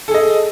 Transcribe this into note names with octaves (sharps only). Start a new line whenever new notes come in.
G#4 A4 D#5